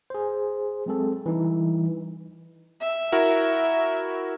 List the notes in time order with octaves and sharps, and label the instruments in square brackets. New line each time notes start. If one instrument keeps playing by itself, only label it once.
[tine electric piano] G#4 C5
F#3 G#3 C4 G#4 A4
E3 G3 D#4 E4
[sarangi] E5
[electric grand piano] E4 F#4 A#4